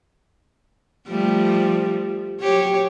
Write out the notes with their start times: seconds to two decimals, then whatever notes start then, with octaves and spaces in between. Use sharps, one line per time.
1.08 F3 G3 A3
2.41 F#3 G4 C#5